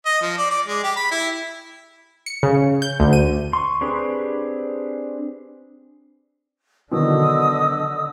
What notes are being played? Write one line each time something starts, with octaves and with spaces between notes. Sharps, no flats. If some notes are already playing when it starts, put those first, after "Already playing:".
D#5
F3
D5
D5
G#3
G4
B5
E4
C#7
C#3
G6
D2
D#7
C6 C#6
C4 D4 G4 G#4 B4
B2 D3 D#3 F#3 D#5 D#6 E6